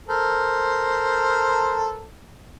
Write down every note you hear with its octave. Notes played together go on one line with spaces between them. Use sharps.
A4 A#4 C5